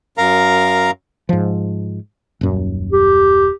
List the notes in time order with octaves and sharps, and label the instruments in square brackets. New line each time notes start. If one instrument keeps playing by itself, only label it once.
[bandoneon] F#2 A#4 F5 A#5
[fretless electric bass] G#2 F3
D#1 F#2
[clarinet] G4